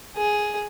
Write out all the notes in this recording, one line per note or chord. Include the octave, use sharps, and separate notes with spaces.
G#4